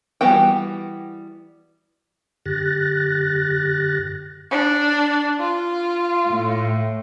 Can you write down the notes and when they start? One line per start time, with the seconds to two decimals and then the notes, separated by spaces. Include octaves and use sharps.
0.21 E3 G3 B3 F#4 G5
2.46 F#2 D3 G4 F#6 A6 A#6
4.51 D4
5.40 F4
6.27 A2